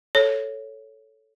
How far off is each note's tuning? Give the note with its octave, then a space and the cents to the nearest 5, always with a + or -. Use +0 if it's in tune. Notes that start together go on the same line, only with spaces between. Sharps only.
A4 +0 C#5 +0